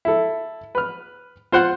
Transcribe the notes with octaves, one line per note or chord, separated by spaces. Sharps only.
E4 A4
B4 F6
F4 C5 F#5 C6